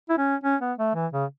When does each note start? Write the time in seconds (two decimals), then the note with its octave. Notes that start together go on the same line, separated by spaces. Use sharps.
0.09 E4
0.18 C#4
0.44 C#4
0.61 B3
0.78 A3
0.95 E3
1.13 C#3